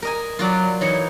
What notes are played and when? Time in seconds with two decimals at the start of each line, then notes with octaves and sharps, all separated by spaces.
0.02 A#4 D#5 G#5
0.39 F#3 F4 F#4 D5
0.81 E3 D#4 C#5